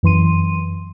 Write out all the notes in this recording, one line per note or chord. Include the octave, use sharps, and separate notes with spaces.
F#2 E3 C6 D#7